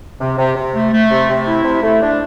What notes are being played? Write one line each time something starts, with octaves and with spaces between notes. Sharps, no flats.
C3
C3
C3
A3
A3
C3
C3
E4
C3
A3
D4